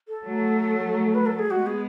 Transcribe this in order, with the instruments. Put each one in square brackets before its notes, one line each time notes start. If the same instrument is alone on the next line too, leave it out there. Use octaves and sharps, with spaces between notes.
[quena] A4
[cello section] F#3 A3
[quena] B4
A4
G#4
[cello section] G#3 B3 [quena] F#4
[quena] G#4